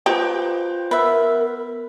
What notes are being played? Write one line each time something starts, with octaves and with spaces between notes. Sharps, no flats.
F4 G4 B4 C5
B3 A#4 B4 E5